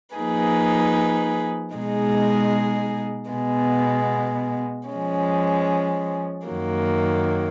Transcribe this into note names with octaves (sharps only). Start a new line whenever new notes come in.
F3 A#3 D#4 G#4 B4
B2 G#3 D#4 G#4
B2 G#3 B3
F3 G#3 C#4
F#2 D#3 F#3 A#3